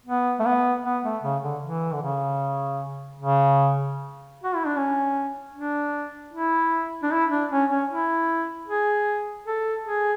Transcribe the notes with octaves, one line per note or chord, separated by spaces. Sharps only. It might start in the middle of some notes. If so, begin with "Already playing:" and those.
B3
A3
B3
B3
A3
C#3
D3
E3
D3
C#3
C#3
F#4
E4
D4
C#4
D4
E4
D4
E4
D4
C#4
C#4
E4
G#4
A4
G#4